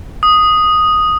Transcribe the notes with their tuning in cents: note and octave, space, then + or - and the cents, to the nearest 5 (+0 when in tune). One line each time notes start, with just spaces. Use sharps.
D#6 +0